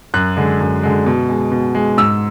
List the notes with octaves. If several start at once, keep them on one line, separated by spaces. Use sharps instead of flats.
F#2 F#6
D3 G#3
F#2
D3 G#3
B2
G#3
B2
G#3
G#2 E6